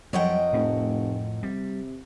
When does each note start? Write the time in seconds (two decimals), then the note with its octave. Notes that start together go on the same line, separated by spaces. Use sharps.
0.13 F2 F#3 G3 A#4 C#5 D#5 F#5 G5
0.53 F1 A2
1.43 C3 G3